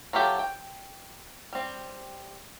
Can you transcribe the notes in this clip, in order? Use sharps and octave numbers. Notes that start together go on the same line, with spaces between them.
F#3 E4 F4 G4 A4
G5
G3 C4